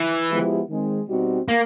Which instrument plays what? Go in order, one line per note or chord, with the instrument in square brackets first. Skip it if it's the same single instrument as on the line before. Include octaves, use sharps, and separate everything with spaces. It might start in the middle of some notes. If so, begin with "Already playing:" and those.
Already playing: [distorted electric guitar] E3
[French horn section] F3 G#3 B3 E4 G4
D#3 G#3 C4
B2 G3 C4 D#4 F#4
[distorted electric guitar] A#3